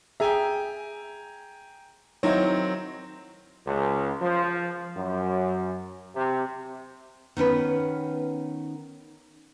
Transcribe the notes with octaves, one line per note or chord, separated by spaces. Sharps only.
G#4 E5 G5 G#5 A#5
D#3 F#3 C4 D#4 E4 C#5
C#2
F3
F#2
C3
D#3 B3 C#4 B4